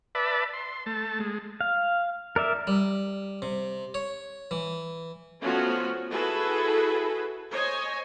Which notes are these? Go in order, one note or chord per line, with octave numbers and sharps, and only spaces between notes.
B4 D5 E5 A5 B5
C6
A3 A5
G#3
F5
A#4 D5 E5
G3
C3
C#5
E3
F3 A3 B3 C#4 F4 F#4
E4 F#4 G#4 A4 B4
C5 C#5 D#5 G#5